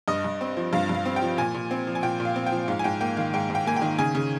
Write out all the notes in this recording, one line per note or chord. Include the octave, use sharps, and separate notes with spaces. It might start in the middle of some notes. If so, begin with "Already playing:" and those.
G2 D#5
G2
C4
F3
G2 F5
G2
F5
C4
G5
F3
A#2 G#5
A#2
C4
F3
G#5
A#2 G5
A#2
F5
C4
G5
F3
G#2 F5
G#5
G#2 G5
A#3 G5
D#3 F5
G#2 G5
G#2
G5
A#3 G#5
G5
D#3
C#3 G#5
C#3